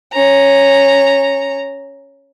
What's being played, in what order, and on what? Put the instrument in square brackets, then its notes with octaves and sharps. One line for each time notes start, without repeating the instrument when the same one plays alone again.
[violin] C#4 A#5